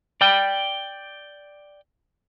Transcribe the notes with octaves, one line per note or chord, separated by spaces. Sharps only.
D5 G5